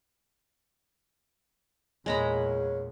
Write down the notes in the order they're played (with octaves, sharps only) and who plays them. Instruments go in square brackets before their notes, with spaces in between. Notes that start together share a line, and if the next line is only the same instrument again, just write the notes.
[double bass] E2 A#2 [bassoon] C#3 [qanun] G#3 A#5 B5